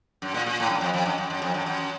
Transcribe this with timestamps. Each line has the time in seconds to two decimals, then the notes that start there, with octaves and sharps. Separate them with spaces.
0.22 F#2
0.34 A#2
0.46 A#2
0.60 A2
0.70 F#2
0.81 F2
0.94 F2
1.05 F#2
1.18 F#2
1.30 F#2
1.42 F2
1.54 F#2
1.66 F#2